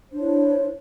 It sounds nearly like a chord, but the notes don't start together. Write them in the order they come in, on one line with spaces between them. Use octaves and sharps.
C5 D4 C#5 E4